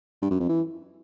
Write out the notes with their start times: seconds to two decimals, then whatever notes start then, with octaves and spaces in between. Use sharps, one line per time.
0.22 G2
0.31 F#2
0.40 F2
0.49 E3